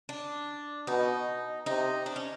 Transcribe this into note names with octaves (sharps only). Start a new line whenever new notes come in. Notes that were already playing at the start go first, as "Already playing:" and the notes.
D4
B2 D#4
C3 D#4
D4
C#4